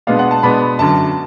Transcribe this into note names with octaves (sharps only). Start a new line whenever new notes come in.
B2 G#3 B3 D4 F5
F#5
A5
B2 G#3 B3 D4 B5
F#2 D3 F#3 A5